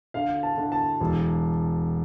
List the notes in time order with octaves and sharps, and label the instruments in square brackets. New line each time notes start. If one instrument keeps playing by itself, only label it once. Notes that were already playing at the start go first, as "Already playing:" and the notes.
[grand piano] D3 F5
A5
D3
A5
E1